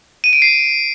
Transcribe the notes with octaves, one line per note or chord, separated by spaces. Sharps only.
D#7
D7
C7